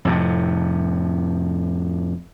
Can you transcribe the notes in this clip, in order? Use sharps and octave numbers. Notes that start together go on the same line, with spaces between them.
F2 A2 C3